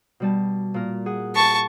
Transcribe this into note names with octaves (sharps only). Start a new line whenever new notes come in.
B2 G3 A5
A#2 A#4
G#4 F#5
A5 C#6